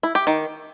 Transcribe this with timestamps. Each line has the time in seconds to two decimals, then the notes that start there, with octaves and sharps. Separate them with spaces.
0.03 E4
0.15 G4
0.27 D#3